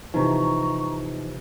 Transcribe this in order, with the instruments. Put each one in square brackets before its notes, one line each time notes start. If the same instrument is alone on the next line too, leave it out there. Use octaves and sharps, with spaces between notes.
[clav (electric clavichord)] C3 E3 F3 [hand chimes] D#4 [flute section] A#5 C#6